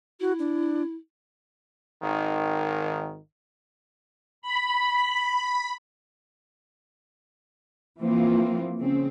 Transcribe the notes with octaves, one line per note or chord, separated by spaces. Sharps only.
E4 F#4
D4
G#1 D#3
B5
E3 F3 A#3 C4 F4
C#3 C4